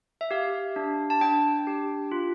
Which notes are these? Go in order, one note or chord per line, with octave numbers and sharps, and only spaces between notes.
E5
G4 F5
D4
A5
D4 G5
G4
F4